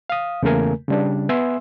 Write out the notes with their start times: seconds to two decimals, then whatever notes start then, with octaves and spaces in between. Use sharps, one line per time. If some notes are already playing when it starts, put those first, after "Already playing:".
0.10 F5 D#6
0.43 E2 C#3 A3 A#3 A#4 G#5
0.88 C#3 G3 D4
1.29 B3 E5 G#5 C6 E6